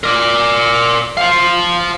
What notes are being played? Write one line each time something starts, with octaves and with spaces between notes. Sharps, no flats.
A#4 D5
C5 F5